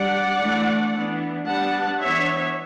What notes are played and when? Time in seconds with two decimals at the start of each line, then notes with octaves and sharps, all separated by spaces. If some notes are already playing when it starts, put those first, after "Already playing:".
Already playing: G3 D4 D5 F#5
0.40 E3 A3 D4
0.94 E3 B3 D4
1.46 G3 B3 D4 F#5 A5
2.01 E3 B3 D4 C#5 E5